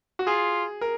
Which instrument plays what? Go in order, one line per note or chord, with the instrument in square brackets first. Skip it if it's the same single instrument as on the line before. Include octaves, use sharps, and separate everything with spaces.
[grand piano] F#4
[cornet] F4 [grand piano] G#4
[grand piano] A#4